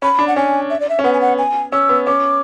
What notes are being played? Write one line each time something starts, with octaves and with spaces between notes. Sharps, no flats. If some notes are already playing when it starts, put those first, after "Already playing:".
C#4 B5
D4
F#5
C#4 G#5
E5
D5
E5
C#4
B3 F#5
G#5
F#5
G#5
C#4 E6
B3
C#4 D6